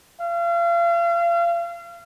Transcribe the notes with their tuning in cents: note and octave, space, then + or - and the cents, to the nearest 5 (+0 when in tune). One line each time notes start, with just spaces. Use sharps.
F5 -35